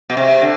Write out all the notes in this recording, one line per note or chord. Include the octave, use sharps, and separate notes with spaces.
B2
C3
D3